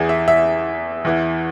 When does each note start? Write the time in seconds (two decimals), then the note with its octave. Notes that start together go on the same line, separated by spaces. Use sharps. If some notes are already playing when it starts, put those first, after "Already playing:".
Already playing: E2 E3 G#4
0.09 E5
0.28 E5
1.05 E2 E3